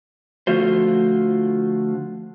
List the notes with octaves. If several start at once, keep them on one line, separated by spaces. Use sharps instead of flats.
D3 F3 A3 F4 F#4 C5